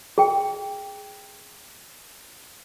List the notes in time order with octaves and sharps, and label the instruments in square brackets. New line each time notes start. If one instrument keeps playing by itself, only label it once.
[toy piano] G#4 G5